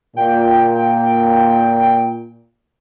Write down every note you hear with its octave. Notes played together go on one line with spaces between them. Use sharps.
A#2 G5